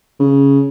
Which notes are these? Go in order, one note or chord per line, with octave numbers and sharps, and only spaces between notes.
C#3